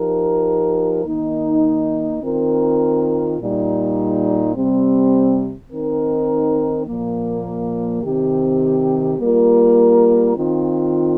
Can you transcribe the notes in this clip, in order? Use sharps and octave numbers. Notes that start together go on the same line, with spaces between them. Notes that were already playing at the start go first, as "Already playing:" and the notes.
Already playing: F3 D#4 G4 A#4
D#3 A#3 D#4
D#3 C4 F4 A#4
A#2 G3 D#4
C3 G3 C4
D#3 C4 D#4 A#4
A#2 F3 A#3
C3 D#3 C4 G4
G3 A#3 F4 A#4
D#3 C4 F4